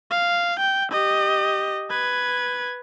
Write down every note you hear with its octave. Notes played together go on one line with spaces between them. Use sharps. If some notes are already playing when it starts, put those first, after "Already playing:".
F5
G5
G4 D#5
B4 G#6